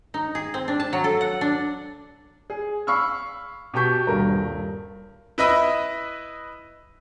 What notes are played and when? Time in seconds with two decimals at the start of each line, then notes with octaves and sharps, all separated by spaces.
0.14 D#4
0.35 G#4
0.54 C4
0.68 D4
0.80 A5
0.93 F#3
1.04 A4
1.21 F#5
1.41 D4
2.50 G#4
2.87 F5 B5 C#6 E6 F6
3.74 B2 G4 A5 C#6 G6 B6
4.07 D#1 G2 A#4
5.38 E4 B4 D#5 E5